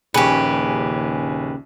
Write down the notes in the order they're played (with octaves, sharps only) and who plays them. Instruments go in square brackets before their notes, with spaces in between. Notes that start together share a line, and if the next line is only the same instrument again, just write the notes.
[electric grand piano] A#1 G#5 C#7 [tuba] D#2 [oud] C#3 [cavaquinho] G4 B4